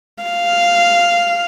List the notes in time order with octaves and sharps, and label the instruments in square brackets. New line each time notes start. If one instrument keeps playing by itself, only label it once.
[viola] F5